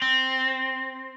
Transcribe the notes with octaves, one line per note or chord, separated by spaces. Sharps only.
C4